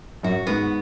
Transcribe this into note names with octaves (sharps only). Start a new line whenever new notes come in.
F#2 F#4
G#2 B3